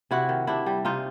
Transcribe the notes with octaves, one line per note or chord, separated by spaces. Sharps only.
C3 E4 F#4
D#3
C3 D4 E4
G3
C3 D#4 F4